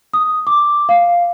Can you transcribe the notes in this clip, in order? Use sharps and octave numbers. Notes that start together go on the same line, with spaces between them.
D#6
D6
F5